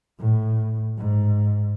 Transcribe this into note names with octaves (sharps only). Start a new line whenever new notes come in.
A2
G#2